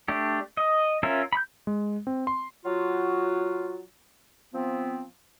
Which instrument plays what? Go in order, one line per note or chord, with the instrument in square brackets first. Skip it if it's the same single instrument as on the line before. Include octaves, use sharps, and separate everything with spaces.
[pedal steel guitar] A3 D4 G4
D#5
C#4 F4 A#4 E5
B5 G6
[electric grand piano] G#3
C4
C6
[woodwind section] F#3 F4 F#4
F3 B3 C4